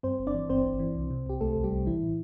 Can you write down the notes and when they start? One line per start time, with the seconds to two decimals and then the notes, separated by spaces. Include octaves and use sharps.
0.03 G2 C4 C5
0.19 G1
0.27 D4 D5
0.34 E3
0.49 G1 C4 C5
0.65 G1
0.79 E3
0.95 C2
1.11 C3
1.26 C2 G4
1.41 C2 A3 A4
1.56 C2
1.64 G3 G4
1.71 C2
1.86 A1 E3 E4
2.02 A2